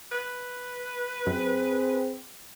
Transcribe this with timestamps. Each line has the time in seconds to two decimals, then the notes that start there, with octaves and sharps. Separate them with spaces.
0.12 B4
1.27 F#2 C4 G#4